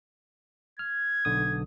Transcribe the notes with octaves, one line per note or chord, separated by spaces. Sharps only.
F6 G#6
B1 D3 D#6